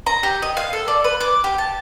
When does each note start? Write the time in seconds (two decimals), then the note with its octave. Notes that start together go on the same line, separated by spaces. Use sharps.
0.06 A#5
0.23 G4
0.42 D#5
0.57 F5
0.73 A4
0.88 D5
1.04 B4
1.20 D6
1.44 G4
1.58 A5